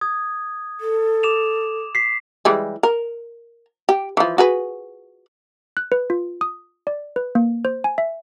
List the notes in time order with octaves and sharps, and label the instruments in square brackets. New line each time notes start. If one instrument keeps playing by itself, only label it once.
[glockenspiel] D#6 G#6
[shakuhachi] A4
[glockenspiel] D6 E7 F7
B6 C7
[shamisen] E3 G3 G#3
A#4
G4
E3 F3
F#4 G#4 B4
[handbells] F#6
B4
F4
D#6
D5
B4
A#3
C5
G#5
E5